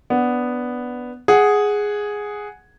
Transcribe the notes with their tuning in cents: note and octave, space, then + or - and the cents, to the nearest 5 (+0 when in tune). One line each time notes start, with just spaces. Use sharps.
B3 +0 D4 -10
G#4 +0 F#5 +0